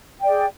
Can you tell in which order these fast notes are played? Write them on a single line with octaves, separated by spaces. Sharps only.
G5 D5 G#4